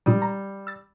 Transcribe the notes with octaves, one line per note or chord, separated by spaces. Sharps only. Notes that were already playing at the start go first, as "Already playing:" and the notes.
A#2 G3 D#6 D7
A#5
E6 A6